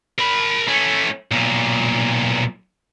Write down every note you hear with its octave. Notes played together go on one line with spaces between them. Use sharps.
A#4 B5
A3 C#4
B1 A#2